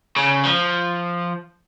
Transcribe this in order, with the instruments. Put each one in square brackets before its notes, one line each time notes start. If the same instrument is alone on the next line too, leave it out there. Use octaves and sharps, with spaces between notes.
[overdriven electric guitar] C#3
F3